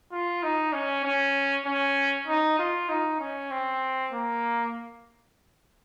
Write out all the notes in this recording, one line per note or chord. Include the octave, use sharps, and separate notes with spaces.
F4
D#4
C#4
C#4
C#4
D#4
F4
D#4
C#4
C4
A#3